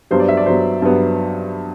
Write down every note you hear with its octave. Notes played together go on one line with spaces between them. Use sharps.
G2 F#3 B3 C5
D5
E5
D5
G2 F#3 B3 C5
G2 F#3 B3